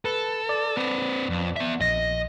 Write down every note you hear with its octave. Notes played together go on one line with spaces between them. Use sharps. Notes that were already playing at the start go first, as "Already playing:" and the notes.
A4 B4
D5
C4 B4
F2
B3 E5
A#1 D#5 A#6